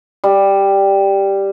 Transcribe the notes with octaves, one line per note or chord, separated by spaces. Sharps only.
G3